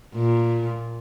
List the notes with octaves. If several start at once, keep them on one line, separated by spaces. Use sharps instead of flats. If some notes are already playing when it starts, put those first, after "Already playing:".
A#2